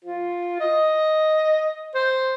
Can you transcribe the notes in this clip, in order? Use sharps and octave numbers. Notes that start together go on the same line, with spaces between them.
F4
D#5
C5